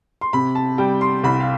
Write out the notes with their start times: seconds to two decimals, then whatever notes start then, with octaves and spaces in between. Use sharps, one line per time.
0.21 C6
0.33 C3 B5
0.55 A5
0.78 G3 G5
1.01 C6
1.23 C2 B5
1.40 F5